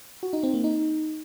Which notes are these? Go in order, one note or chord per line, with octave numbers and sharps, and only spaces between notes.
F#4
D#4
C4
A#3
D#4